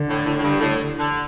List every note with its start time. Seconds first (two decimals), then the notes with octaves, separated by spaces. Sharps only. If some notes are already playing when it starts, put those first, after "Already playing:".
Already playing: D3
0.09 A2
0.26 A2
0.36 A2
0.43 G2
0.60 A2
0.99 D3